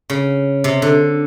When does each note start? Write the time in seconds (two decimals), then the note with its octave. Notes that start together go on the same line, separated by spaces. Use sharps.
0.10 C#3
0.64 C3
0.82 D3